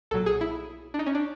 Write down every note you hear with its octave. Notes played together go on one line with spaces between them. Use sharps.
B1 A#2 F#3 A4
G#4
E4
D4
D#4
C#4
D4